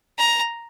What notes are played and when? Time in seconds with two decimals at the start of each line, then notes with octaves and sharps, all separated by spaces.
0.19 A#5